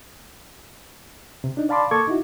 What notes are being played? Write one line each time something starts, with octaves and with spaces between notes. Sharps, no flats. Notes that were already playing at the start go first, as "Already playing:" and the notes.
C3
D4 D#4
D5 F5 A5 B5 C6 D6
A#3 A4 C#6 D6 G#6
D#4 E4 F#4